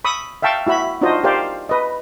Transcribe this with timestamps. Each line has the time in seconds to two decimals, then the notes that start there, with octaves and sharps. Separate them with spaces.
0.05 B5 C#6 D#6 E6
0.42 E5 F5 G5 A5 C#6
0.67 E4 F#4 E5 B5
1.01 D4 D#4 F4 F#4 C5 D#5
1.24 G4 A#4 C5 D5 F5
1.69 B4 D#5